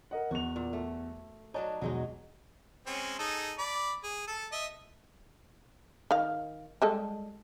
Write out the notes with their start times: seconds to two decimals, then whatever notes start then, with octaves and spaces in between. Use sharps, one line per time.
0.11 A#4 D#5 F#5
0.31 E2 F#4 F7
0.56 A#2
0.73 A3
1.54 F#3 D4 D#4 C#5 A5
1.81 B1 E2 F#3 G#3 D#4
2.86 G#3 C4 C#4
3.19 D#4 G#4 A4
3.58 D5 B5
4.04 G#4
4.27 A4 A5
4.52 D#5 E5
6.11 D#3 F5
6.82 G3 G#3 A4